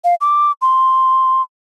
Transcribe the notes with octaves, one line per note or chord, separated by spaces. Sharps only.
F5
D6
C6